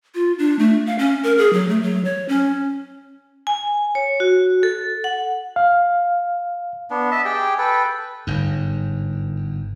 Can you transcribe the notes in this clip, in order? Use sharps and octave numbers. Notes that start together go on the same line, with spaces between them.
F4
D4
A3
F5
C#4
A#4
G#4
F#3
A3
F#3
C#5
C#4
G#5
C#5
F#4
A4
F#5
F5
B3 D4
D#5 E5 A5
G4 G#4 G5
A4 B4 G5
G1 G#2